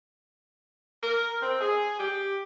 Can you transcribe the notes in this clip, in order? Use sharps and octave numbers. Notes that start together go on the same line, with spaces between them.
A#4
C4
G#4
G4